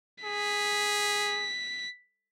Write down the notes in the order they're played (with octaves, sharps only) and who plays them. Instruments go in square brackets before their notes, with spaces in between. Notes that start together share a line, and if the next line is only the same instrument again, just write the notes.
[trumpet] G#4 [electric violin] B6